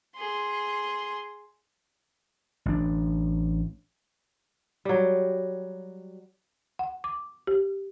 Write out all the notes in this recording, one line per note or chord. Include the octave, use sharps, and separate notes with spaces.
G#4 C6
A1 D4
F#3 G3
F#5
D6
G4